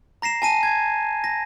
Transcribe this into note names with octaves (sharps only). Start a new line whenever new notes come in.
A#5 A#6 C7 E7
G#5 A5 D#7
G#6
A#6